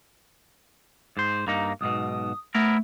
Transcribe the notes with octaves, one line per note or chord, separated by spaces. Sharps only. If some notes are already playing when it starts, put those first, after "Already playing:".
G#2 C5
G2 A#3 D#4
B1 G#2 B2 D#6
A3 B3 E4 A#4